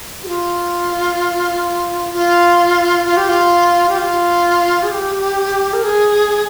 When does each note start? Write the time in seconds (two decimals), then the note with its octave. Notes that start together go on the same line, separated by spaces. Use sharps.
0.24 G4
0.28 F4
2.13 F4
3.05 F4
3.17 G4
3.29 F4
3.89 G4
3.98 F4
4.83 G#4
4.91 G4
5.73 A#4
5.83 G#4